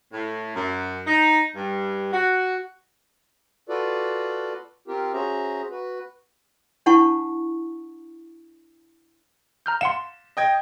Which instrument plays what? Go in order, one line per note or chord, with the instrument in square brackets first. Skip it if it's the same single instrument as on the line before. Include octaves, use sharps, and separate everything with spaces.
[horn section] A2
F#2
D#4
G2
F#4
[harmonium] F4 F#4 A4 B4 D5
C4 F4 G4 A#4
C#4 F#4 G#4 C5 E5 A#5
F#4 B4
[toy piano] D4 E4 F#5 A5 B5 C#6
[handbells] A#5 F6 G6
[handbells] F5 F#5 C6 [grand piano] E7
[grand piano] D#5 G5 G#6